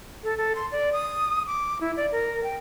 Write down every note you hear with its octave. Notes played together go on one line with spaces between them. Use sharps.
A4
A4
C6
D5
D#6
D6
E4
D5
A#4
G5